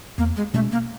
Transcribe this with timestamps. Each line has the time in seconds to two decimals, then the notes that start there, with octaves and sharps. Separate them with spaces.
0.18 E2 A#3
0.36 G#3
0.54 B2 G#3 A3 C#4
0.72 A#3